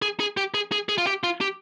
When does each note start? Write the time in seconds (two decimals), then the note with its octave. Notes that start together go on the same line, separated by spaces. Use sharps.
0.02 G#4
0.20 G#4
0.37 G4
0.54 G#4
0.72 G#4
0.89 G#4
0.98 F4
1.07 G4
1.24 F4
1.41 G4